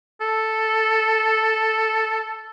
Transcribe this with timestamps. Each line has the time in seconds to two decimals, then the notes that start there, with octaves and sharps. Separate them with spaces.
0.21 A4